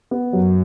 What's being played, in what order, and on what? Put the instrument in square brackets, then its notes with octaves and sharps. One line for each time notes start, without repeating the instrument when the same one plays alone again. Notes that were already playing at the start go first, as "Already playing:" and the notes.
[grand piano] B3
[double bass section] F#2 [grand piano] F#3